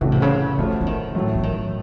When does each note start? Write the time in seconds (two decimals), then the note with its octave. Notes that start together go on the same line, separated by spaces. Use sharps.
0.01 A2 C#3 E3 A3 C#4 F#4
0.12 C3
0.22 C#3
0.58 D3 F3 A3 C#4 F#4
0.81 E3
0.86 D#3
1.15 A2 F#3 A3
1.35 E3
1.43 D#3